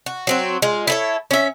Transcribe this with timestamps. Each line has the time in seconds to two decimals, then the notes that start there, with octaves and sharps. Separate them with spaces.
0.06 F#4
0.27 F#3 C4 F#4
0.62 G#3 F4
0.87 E4 A4 C#5
1.31 C#4 E5